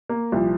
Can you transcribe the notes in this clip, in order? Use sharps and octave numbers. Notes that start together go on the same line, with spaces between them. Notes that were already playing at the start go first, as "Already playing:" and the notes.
A#3
C2 A#2 F3